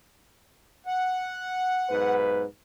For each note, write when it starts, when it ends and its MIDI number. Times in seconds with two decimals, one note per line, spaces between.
0.86 2.14 78
1.89 2.44 35
1.89 2.44 44
1.89 2.44 71